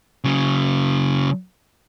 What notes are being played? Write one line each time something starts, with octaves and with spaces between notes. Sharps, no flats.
C#3 F#3